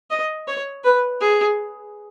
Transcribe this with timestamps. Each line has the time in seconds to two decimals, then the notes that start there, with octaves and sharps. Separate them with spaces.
0.11 D#5
0.48 C#5
0.84 B4
1.21 G#4